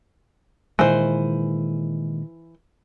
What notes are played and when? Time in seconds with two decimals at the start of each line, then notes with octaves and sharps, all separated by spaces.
0.79 A#2 D#3 E3 G#3 C5